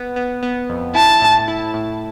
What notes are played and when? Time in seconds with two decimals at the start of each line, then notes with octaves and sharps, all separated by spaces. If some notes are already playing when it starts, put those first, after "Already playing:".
Already playing: B3
0.16 B3
0.43 B3
0.69 F2
0.95 E4 A5
1.21 A2
1.48 E4
1.74 A2